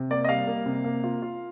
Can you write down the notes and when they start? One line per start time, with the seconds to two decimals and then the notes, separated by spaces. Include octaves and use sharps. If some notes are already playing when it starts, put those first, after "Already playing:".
Already playing: C3
0.10 A#3 D5
0.24 D#5
0.29 G3 F5
0.47 A#3
0.66 C3
0.84 A#3
1.04 F4
1.22 F4